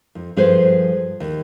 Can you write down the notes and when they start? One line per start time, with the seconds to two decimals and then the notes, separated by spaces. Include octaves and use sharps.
0.15 F2
0.36 G2 F3 G#4 A4 B4 C5
1.20 D#2